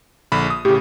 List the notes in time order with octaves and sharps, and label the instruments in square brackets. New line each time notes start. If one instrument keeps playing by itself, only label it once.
[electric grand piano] A#1 D3 B5
D#6
[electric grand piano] A2 C#3 [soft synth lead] G4